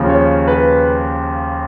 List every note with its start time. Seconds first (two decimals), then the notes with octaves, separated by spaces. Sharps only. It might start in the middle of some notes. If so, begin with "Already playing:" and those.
Already playing: D#2 C#3 F3
0.09 C#5
0.48 B4